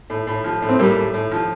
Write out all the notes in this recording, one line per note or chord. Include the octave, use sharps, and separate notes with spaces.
A2
A2
F3
A2
C4
A2 G3 A#3
A2
A2
F3